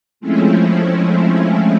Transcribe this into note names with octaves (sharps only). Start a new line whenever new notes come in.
F3 G#3 A3 C4 C#4 E4